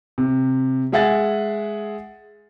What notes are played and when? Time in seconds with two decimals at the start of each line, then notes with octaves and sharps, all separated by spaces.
0.18 C3
0.92 G#3 G#4 E5 F#5 G#5 A6